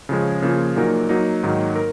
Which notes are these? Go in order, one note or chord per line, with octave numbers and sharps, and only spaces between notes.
C#3 F3 G#3 C#4 G#4
C#3 F3 A#3 F4 G#4
A#2 F#3 A#3 D#4 A#4
F#3 A#3 D#4
G#2 D#3 F#3 A#3 D#4
A#4